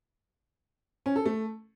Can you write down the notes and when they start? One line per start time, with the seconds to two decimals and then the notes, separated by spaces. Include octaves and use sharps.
1.06 C#4
1.16 A4
1.26 A3